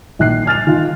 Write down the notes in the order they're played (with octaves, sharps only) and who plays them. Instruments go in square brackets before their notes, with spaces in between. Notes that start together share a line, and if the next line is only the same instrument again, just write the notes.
[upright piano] A#1 D#3 F#6 C7
G#5 F6 A6 F7
D#3 F4